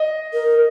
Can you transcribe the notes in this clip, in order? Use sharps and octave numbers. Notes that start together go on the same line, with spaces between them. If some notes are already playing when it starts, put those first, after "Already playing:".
Already playing: D#5
A#4